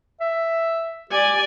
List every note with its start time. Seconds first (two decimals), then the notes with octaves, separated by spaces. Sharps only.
0.21 E5
1.11 G4 D5 G#5